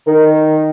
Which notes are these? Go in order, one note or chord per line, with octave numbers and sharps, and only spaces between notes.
D#3